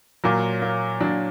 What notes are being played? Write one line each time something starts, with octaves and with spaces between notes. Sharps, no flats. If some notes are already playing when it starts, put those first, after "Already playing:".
A#2 F#3 A#3
A#3
A#2 F#3 D4